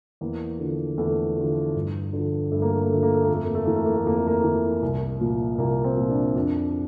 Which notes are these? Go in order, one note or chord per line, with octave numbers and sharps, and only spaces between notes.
E2 A#3
D3 F3
E2 A3
D3 F3
G2
D3 F3
G2 A3
A#3
A3
A#3
D3 F3 A3
A#3
A3
F2 A#3
A3
A#3
A3
E3 A#3
A3
A#3
A3
F2 A#3
A3
A#3
A3
E3
C2
A#2 F3
C2 A#3
C4
A#2 F3
D4
F2 D4